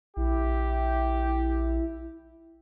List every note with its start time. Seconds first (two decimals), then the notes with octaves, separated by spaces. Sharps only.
0.17 A#1 E4 G4